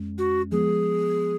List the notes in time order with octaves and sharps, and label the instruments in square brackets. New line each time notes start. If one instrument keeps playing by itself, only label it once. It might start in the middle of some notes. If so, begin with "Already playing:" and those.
Already playing: [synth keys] F2 G#3 C#4
[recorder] F#4
[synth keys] F3 G#3 B3 [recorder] G#4